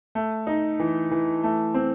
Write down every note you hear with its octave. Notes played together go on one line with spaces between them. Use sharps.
A3
D#4
E3
E3
A3
C4